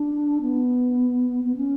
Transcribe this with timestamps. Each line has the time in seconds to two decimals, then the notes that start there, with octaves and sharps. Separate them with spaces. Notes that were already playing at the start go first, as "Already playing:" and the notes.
Already playing: D4
0.42 B3
1.44 B3
1.57 C#4